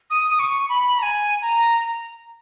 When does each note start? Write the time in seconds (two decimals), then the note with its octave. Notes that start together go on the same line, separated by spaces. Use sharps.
0.10 D#6
0.30 D#6
0.39 C#6
0.69 B5
0.99 A#5
1.02 G#5
1.42 A#5